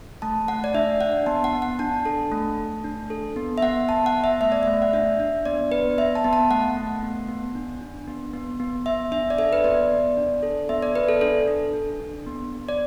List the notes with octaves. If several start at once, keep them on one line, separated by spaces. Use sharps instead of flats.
A3 A5
A3 F#5
D5
D4 E5
D4 F#5
B3 A5
F#5
B3
F#5
D4 A5
A4 A5
A3
A3
D4
A4
B3
E5
B3 F#5
B3 A5
F#5
B3
E5
A3 E5
D5
A3 E5
F#5
D4 E5
D4
B3 D5
B3 B4
B3 E5
A5
B3
A5
A3 F#5
A3
B3
B3
D4
D4
B3
B3
B3
B3 E5
D4 E5
D5
A4 E5
B4
B3 D5
B3
D4
A4
B3 E5
D5
B3 B4
A4
D4 A4
A4
D4
D4
B3
B3
D5